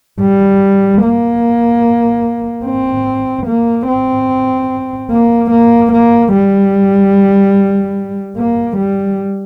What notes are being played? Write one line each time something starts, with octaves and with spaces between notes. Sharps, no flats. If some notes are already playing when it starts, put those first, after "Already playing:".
G3
A#3
C4
A#3
C4
A#3
A#3
A#3
G3
A#3
G3